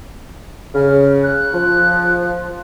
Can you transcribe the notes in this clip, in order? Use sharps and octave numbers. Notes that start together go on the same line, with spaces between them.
C#3 F6
F#6
F3